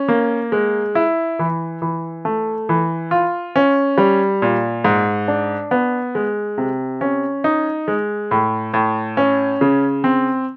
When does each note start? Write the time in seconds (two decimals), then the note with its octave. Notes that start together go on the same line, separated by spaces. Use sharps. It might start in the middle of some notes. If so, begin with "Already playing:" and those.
Already playing: C#4
0.08 A#3
0.52 G#3
0.95 E4
1.39 E3
1.82 E3
2.25 A3
2.69 E3
3.11 F4
3.56 C#4
3.98 G3
4.42 A#2
4.84 G#2
5.28 D4
5.71 B3
6.15 G#3
6.58 C3
7.01 C#4
7.44 D#4
7.88 G#3
8.31 A2
8.74 A2
9.17 C#4
9.61 C#3
10.04 C4